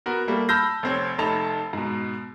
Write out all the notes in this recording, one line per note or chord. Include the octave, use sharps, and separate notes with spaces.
B3 F#4 A#4
G3 A3 A#3
A5 B5 E6 F6 G6 A#6
F1 C4 C#5
F1 A3 D#4 A5 B5 F7
G#2 B2